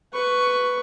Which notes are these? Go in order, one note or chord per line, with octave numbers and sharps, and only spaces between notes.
B4 C#6